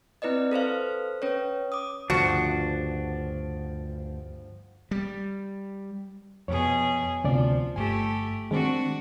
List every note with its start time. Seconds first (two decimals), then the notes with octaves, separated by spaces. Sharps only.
0.22 C4 E4 B4 D5 D#5
0.51 A4 B4 C5 F5
1.22 C#4 B4 C#5
1.72 D6 D#6
2.10 D2 G2 C#3 F3 D4 F#4
4.91 G3
6.48 F2 B2 G#4 C#5
7.24 D2 C3 F3 B3 C#4 D5
7.76 G1 A3 G4 G#5
8.51 D#3 G#3 C4 D4 F#4